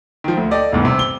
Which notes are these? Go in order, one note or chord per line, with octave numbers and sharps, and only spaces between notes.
D#3 F3
D2
G4 A4 D5 D#5
F1 E2 G2
C3
G7